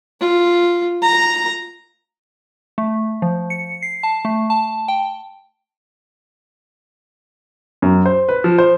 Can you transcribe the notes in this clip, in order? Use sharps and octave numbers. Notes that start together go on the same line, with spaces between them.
F4
A#5
A3
F3
C#7
C7
A5
A3
A5
G5
F#2
C5
B4
F3
C5